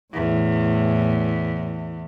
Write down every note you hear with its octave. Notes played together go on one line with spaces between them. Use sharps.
E2 A2